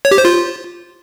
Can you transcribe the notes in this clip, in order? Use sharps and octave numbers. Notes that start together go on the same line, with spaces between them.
C#5
G4
C5
F4